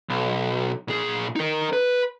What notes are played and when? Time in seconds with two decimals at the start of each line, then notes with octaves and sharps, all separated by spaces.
0.09 B1
0.88 A#2 G#4
1.36 D#4 A#4
1.73 B4